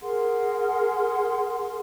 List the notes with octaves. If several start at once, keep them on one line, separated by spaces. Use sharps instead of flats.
G#4 A#4 F#5 C6